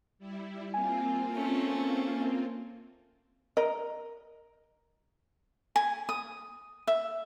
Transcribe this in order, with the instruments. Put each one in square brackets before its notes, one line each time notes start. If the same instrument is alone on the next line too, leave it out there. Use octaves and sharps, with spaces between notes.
[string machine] G3 E4
[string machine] A#3 C4 F4 [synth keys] G#5
[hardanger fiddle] A3 C#4
[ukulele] A#4 [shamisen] D#5
[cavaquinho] G#5
D#6
E5